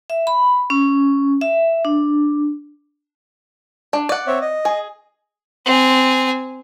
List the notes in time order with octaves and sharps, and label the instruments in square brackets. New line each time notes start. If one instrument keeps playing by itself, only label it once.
[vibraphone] E5
B5
C#4
E5
D4
[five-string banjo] D4
D5 F#5
[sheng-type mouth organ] C4 C#5 E5
D#5
[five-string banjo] G#4
[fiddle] C4 G#5